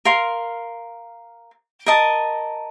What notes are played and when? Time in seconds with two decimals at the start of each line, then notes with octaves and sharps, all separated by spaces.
0.05 A#4 F5 C6
1.86 A#4 D#5 A5